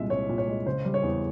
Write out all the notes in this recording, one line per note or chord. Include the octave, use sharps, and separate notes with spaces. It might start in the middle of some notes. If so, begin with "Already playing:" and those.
Already playing: C2 A#2 G#3 E5
C2 C#5
A#2
C#5
G#3
C#3 C5
G3
C#5
E2